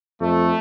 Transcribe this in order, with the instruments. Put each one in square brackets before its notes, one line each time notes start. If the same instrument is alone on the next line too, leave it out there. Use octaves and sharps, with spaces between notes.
[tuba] F2 [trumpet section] A3